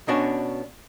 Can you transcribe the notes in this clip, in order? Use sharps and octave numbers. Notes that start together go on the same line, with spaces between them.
B2 C#4 D4 F#4